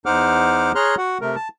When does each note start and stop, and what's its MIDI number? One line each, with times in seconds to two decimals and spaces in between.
0.06 0.72 40
0.06 0.72 63
0.06 0.72 72
0.06 0.72 78
0.06 0.72 86
0.06 0.72 89
0.75 0.95 68
0.75 0.95 73
0.75 0.95 82
0.75 0.95 84
0.75 0.95 89
0.75 0.95 90
0.98 1.18 66
0.98 1.18 78
1.21 1.36 48
1.21 1.36 57
1.21 1.36 70
1.36 1.48 81